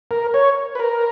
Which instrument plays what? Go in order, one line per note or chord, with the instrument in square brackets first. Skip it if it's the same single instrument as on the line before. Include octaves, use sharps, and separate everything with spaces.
[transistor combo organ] A#4
C#5
B4
A#4